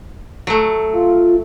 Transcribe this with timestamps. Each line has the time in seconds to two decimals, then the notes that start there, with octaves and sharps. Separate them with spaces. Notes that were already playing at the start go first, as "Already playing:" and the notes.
0.47 F#3 A3
0.93 F4